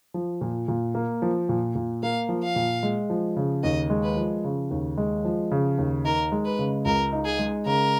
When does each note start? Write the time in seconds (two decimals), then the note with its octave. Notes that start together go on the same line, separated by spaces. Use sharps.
0.14 F3
0.41 A#2
0.68 A#2
0.95 A#3
1.22 F3
1.49 A#2
1.75 A#2
2.03 A#3 F5
2.29 F3
2.43 F5
2.56 A#2
2.83 G#3
3.10 F3
3.37 C#3
3.63 D#2 D#5
3.90 G#3
4.03 B4
4.17 F3
4.44 C#3
4.71 D#2
4.98 G#3
5.25 F3
5.51 C#3
5.78 D#2
6.04 D#4 A#4
6.32 G#3
6.45 B4
6.59 C#3
6.85 C#2 A#4
7.13 D#4
7.25 G#4
7.39 G#3
7.66 C#3 A#4